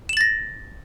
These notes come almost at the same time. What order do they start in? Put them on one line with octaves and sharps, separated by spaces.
E7 F#7 A6 A#6